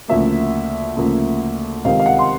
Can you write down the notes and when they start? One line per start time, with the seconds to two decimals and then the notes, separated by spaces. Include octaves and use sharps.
0.08 D2 C#3 F3 A#3 E5
0.96 D2 C#3 F3 A#3
1.84 C#2 C3 D#3 G3 C4 F5
1.99 F5
2.06 F#5
2.18 C6